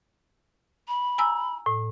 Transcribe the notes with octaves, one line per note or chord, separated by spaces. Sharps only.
B5
G#5 A#5 E6
A2